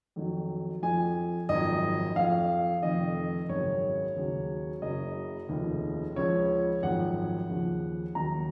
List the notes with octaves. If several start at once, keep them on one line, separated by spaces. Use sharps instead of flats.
F2 D#3 F#3
F2 F3 G#5
G#1 F#2 F3 D#5
F2 F3 F5
F1 F2 D#3 D#5
G#1 F#2 C#3 C#5
D#2 C#3 F#3
F#1 F#2 C#3 F#3 D#5
F1 D#2 C#3 F3
C#2 C#3 F3 C#5
G#1 F#2 F3 F#5
D#2 C#3 F3
D#2 D#3 F#3 A#5